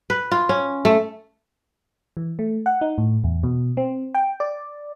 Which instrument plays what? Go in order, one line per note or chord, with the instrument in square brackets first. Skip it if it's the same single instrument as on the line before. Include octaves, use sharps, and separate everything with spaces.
[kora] B4
F4
C#4
A3
[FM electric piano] E3
A3
F#5
D#4
A2
E2
B2
C4
G5
D5